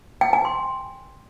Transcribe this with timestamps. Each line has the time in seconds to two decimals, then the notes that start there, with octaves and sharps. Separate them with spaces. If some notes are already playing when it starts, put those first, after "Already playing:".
0.21 G5
0.33 G#5
0.45 C6